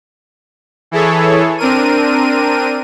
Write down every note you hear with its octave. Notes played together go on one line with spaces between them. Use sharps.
E3 E4 G#4 A4 C#5
C4 D4 A#4 D#7